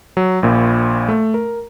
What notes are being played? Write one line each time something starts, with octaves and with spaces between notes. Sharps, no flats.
F#3
A#1 A#2
A3
A#4